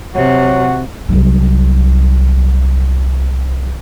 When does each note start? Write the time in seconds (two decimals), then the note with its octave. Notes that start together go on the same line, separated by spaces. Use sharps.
0.15 C3 F#3 F#4
1.09 C2 F#3